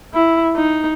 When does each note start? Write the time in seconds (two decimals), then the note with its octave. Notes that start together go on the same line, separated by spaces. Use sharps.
0.13 E4
0.56 D#4